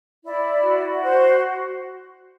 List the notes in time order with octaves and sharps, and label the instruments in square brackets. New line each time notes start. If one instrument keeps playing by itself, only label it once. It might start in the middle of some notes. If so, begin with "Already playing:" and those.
[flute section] E4 D5
F#4
C5